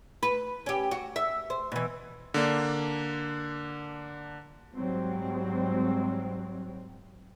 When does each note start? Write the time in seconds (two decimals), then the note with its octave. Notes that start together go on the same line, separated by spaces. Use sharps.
0.23 B4
0.66 C#4 G4
0.91 F#4
1.16 E5
1.50 C5
1.72 B2 E3
2.34 D3 A#3 D4
4.75 G#2 F#3 G3 C4